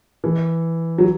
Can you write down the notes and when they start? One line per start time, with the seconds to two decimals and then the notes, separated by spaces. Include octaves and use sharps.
0.24 E3
0.98 F#3